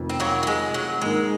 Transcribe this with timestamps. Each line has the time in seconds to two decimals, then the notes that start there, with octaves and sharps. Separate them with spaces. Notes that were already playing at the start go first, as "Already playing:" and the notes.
Already playing: F1 F2 D#3
0.09 C4
0.20 F#3 A#3
0.43 F#3
0.47 G#3
0.74 F#3
1.02 G#2 D#3 G#3 A#3